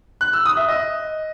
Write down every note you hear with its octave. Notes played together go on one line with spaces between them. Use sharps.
F#6
E6
D#6
E5
D#5